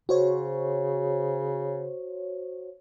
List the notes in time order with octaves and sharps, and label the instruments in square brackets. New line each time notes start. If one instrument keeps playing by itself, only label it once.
[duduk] C#3 [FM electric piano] F#4 C5 C#5